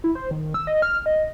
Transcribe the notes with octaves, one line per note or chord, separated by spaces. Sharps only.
E4
C5
D#3
E6
D#5
F6
D#5